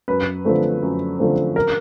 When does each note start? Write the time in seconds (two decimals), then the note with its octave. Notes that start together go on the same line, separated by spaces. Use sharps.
0.08 F#2 B4
0.45 D3 F3 A3 C4
0.82 F#2
1.19 D3 F3 A3 C4
1.56 A#4